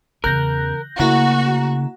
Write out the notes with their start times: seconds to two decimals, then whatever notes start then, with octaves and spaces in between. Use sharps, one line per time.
0.24 E2 C#3 A#4 F#6 G6 A#6
0.99 C#3 A3 A#3 E4 F#4 A#5